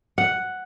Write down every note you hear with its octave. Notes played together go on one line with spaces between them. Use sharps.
F#5